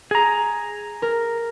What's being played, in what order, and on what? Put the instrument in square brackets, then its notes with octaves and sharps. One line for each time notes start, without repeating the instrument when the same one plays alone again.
[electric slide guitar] G#4 A#5
[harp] A#4